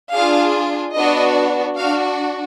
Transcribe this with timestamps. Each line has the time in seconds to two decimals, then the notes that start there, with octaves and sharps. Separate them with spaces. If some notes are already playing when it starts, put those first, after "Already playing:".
0.13 D4 F4 G#4 F5
0.95 B3 D4 F#4 D#5
1.77 D4 F#4 F5